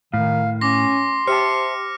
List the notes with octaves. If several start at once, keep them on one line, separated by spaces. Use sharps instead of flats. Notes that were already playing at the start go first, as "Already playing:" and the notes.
A2 D#3 F5
C#4 C6 D6 A#6
G4 C5 E5 A5 F6 C#7